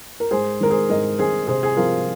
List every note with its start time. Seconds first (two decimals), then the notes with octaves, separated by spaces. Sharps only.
0.20 A#4
0.31 G#2 G#4 C5
0.60 D#3 G#3 C4 A#4
0.70 G#4 C5
0.89 G#2 A#4 D#5
1.19 D#3 G#3 C4 G#4 C5
1.47 C3 G#4 C5
1.63 G#4
1.77 F3 C4 F4 A#4